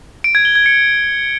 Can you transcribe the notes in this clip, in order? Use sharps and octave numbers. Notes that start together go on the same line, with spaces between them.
D7
G#6
G7
G#6
C#7